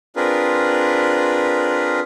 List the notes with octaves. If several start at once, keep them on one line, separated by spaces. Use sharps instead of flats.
C4 D4 F4 G#4 A#4 B4